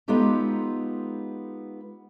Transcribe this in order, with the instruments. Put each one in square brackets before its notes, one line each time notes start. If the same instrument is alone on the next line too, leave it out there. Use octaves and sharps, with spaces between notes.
[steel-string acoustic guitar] G#3 B3 D#4 F4 G4 A4